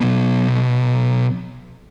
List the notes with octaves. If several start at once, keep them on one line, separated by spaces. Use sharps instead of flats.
B1 B2